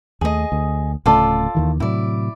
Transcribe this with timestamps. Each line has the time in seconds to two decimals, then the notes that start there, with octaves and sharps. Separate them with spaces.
0.21 D#2 A3 G#4 D#5
0.52 D2
1.06 D1 C#3 A3 F4 A4 D5
1.55 D#2 D#3 E3
1.80 A2 C3 F#3 E4 D5